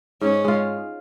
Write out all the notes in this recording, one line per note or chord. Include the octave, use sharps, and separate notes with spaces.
G#2 C#4
G#3 F4